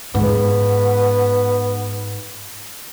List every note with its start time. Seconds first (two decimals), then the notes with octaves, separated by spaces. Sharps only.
0.15 G#2 B3